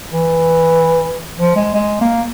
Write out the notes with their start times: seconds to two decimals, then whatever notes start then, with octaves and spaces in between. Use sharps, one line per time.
0.12 E3
1.38 F3
1.56 G#3
1.74 G#3
2.01 A#3